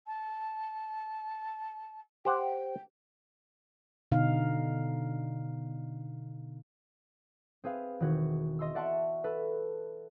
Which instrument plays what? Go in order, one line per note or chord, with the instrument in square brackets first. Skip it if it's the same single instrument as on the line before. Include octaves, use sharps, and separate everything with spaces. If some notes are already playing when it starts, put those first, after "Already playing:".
[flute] A5
[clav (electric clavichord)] G4 C5 F#5 [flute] G5
[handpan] B2 D3 D#4 F5
[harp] C4 G#4 B4 F5
E1 D#3 F#4 G#6
D#5 C6 E6
D5 E5 F#5 A5 C6 C#6
A4 B4